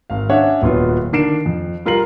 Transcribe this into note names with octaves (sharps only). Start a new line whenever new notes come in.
G#1 F5
C#4 D4 C#5 E5 F#5
D#1 F#3 B3 F4
D3 D#3 D4 C7 D7 E7
F2
G3 F4 A#4 C7 F#7